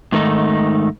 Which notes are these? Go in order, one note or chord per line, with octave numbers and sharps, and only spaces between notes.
G#2 D#3 A3 D#4